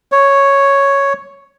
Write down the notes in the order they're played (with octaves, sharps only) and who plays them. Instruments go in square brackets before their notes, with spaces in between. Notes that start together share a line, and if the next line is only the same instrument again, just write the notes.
[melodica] C#5